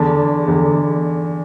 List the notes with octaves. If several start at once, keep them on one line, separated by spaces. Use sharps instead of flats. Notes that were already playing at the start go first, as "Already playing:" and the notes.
Already playing: E2 D3 A5
E2 D3